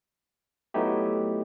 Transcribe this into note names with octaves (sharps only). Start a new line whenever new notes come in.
F#3 A3 B3 D#4 E4 G4